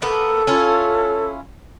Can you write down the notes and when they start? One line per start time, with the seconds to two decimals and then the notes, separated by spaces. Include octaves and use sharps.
0.02 A#3 B3 A4
0.47 C#4 E4 F4